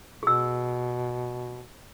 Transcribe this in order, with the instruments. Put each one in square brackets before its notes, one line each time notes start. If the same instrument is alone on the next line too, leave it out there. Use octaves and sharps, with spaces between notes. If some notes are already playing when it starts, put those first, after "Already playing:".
[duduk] B2 [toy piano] G#4 E6